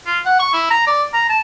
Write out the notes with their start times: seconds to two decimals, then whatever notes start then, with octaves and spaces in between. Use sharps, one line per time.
0.06 F4
0.26 F#5
0.39 C#6
0.53 E4
0.70 A#5
0.87 D5
1.14 A#5
1.29 A5